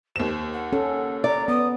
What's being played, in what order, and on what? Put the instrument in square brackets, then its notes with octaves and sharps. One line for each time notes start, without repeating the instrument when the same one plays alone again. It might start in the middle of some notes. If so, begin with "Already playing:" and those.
[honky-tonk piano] D#2 E7 [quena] C5
[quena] F#5
[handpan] C#4 A4
[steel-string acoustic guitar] D5 [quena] A#5
[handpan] B3 [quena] D#6